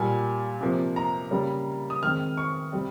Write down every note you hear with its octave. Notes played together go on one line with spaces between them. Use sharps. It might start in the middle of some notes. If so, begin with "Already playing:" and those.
Already playing: A#2 G3 A#3 G#5
C3 F3 A#3
A#5
C#3 G3 A#3
D#6
D#3 G#3 C4 F6
C#6
C3 G3 C4